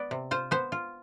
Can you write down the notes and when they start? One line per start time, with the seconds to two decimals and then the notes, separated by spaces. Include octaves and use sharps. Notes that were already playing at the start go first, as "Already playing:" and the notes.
Already playing: B3 D5
0.11 C3
0.31 F4 C5
0.51 B3 C5
0.72 F4